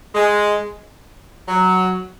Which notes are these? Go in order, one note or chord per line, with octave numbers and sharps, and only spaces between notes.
G#3
F#3